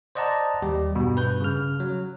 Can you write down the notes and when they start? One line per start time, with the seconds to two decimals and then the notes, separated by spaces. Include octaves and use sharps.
0.15 C5 D5 D#5 F#5 A5 A#5
0.62 D#2 G3 G4
0.95 G2 B2
1.16 G2 B4 G6
1.40 C#3 F6
1.80 F#3